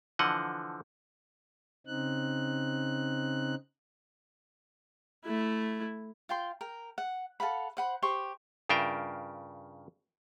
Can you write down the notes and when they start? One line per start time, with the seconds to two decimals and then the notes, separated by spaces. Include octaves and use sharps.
0.19 D3 E3 F3 D#5 F#5
1.87 C#3 C4 D#4 F#6
5.25 A3 E4
6.29 F4 G5 C6
6.61 A#4 G5
6.98 F#5
7.40 A4 F5 F#5 B5
7.77 C5 F#5 B5
8.02 G4 C5 C6 C#6
8.69 G2 C#3 F4 A#4 E5 G5